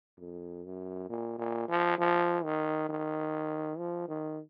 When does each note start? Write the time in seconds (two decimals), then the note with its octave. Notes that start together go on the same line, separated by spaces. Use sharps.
0.19 F2
0.65 F#2
1.09 A#2
1.39 A#2
1.69 F3
1.98 F3
2.44 D#3
2.89 D#3
3.79 F3
4.08 D#3